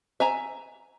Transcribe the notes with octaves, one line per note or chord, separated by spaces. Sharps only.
E5 G#5 A#5